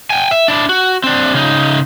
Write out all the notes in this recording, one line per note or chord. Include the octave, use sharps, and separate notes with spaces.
G5 G#5
E5
D4 E4
F#4
C4 D4
C#3 D#4